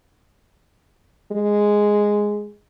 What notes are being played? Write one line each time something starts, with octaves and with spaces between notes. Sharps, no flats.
G#3